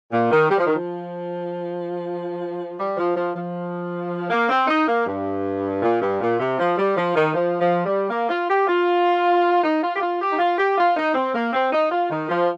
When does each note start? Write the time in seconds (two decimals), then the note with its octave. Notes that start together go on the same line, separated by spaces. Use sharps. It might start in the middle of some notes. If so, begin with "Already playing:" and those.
0.11 A#2
0.31 D#3
0.49 G3
0.58 F3
0.66 D#3
0.75 F3
2.77 G3
2.97 F3
3.16 F3
3.35 F3
4.30 A#3
4.49 C4
4.68 D#4
4.87 A#3
5.06 G2
5.82 A#2
6.01 G2
6.21 A#2
6.40 C3
6.58 F3
6.78 G3
6.96 F3
7.16 D#3
7.34 F3
7.60 F3
7.85 G3
8.10 A#3
8.29 F4
8.49 G4
8.67 F4
9.62 D#4
9.82 F4
9.96 G4
10.00 F4
10.20 G4
10.32 D#4
10.39 F4
10.58 G4
10.77 F4
10.96 D#4
11.14 C4
11.34 A#3
11.53 C4
11.72 D#4
11.91 F4
12.10 D#3
12.29 F3